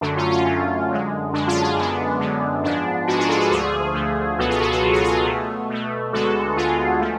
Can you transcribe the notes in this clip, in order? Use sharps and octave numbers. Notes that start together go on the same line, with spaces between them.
F#2 D3 F#3 A3 D4
C#4 F4
C#4 F4
F#2 D3 F#3 A3
F#2 D3 G#3
F#2 D3 G#3 D4
C#4 F4
F4 G#4
F#2 D3 G#3 B3 D4
F#2 D3 G#3 B3
G#2 F3 G#3 B3 D4
G#2 F3 G#3 B3 D4 F#4
F4 G#4
F#4 A4
F#4 A4
D2 D3 F3 A3 F4 G#4
D2 D3 F3 A3
C#2 B2 F#3 B3 F#4 A4
F4 G#4
F#4 A4
F4 G#4
C#2 B2 F#3 B3
F4 G#4
F4 G#4
B2 A3
B2 A3
D2 D3 G#3 B3 F#4 A4
D2 D3 G#3 B3 F4 G#4
F3 A3